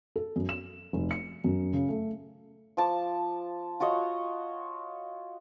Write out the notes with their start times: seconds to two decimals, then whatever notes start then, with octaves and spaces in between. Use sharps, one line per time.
0.16 A4
0.36 F#2
0.49 E7
0.93 F1
1.11 C#7
1.44 F#2
1.73 C#3
1.89 A3
2.77 F3 A5 D6
3.80 F4 F#4 C#5 D#5